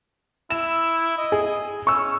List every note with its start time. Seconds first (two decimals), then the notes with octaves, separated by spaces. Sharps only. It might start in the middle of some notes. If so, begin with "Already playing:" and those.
0.50 E4 E7
1.18 D#5
1.32 G#4
1.87 C#4 C#6 E6